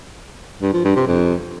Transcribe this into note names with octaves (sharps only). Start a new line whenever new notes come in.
G2
F3
G2
C3
F2